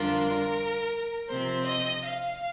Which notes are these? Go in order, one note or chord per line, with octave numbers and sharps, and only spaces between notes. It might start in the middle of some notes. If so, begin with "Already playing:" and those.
Already playing: F2 D3 G3 D4 F4 A#4
C3 F3 C4 C5
D#5
F5